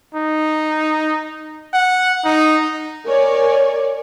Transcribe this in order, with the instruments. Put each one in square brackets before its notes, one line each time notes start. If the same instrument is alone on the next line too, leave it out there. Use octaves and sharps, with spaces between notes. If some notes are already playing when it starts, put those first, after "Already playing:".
[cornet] D#4
F#5
D#4
[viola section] A#4 C#5 D5 G#5